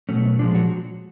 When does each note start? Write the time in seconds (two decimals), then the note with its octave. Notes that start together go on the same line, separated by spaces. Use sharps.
0.09 B2 F#3 A3 C#4
0.39 A#2 F3 G#3 D4
0.55 F#3 F#4